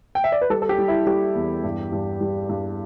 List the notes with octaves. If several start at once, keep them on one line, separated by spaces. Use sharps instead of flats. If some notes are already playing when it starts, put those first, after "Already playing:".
G5
E5
D5
B4
G3 A4
A4
G4
G3
E4
G3 G4
E2
G2
G2
G3
G2